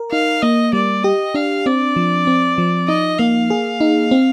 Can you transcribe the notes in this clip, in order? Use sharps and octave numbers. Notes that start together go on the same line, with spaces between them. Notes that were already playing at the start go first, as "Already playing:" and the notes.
Already playing: A#4
D#4 F5
A#3 D#5
G3 D5
G4 D#5
D4 F5
C4 D5
F3
C4
F3
D#4 D#5
A#3 F5
G#4
D#4
C4